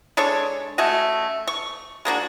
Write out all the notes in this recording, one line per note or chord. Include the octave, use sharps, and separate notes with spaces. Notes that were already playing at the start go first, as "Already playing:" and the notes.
G#3 D4 A4 C#5
A3 C#4 F#4 D#5
C#6
G#3 A#3 D4 F#4